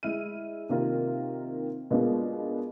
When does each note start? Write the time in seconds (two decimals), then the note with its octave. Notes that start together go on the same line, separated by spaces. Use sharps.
0.03 G#3 E4 F6 D#7
0.69 C3 D#3 A#3 F4 A#4
1.90 B2 G#3 A#3 B3 D4 F4